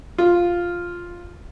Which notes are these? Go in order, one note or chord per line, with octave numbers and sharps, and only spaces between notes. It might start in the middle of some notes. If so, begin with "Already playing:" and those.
F4